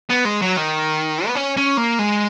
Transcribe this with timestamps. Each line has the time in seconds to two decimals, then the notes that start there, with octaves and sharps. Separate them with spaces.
0.10 B3
0.25 G#3
0.41 F#3
0.57 D#3
1.27 B3
1.35 C#4
1.57 C#4
1.77 A#3
1.99 G#3